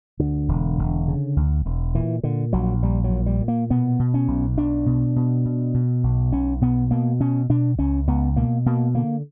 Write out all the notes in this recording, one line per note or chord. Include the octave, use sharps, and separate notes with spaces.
D2 D3
E1
E1
C#3
D2
E1
A#2 E3
A#2 D3
A#1 F#3
A#1 G3
F#3
A#2
G3
A#2
A#3
B2 B3
B2
C#4
B1
B1 D4
B2
B2
B2
B2
B1
B1 C#4
B2 B3
B2 A#3
B2 C#4
B2 D4
C#2 C#4
C#2 B3
B2 A#3
B2 A#3
D3 A#3